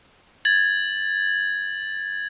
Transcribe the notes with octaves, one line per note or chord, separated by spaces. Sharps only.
G#6 A6 F#7